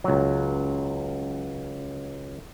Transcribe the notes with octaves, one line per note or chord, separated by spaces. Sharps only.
C#2 F#3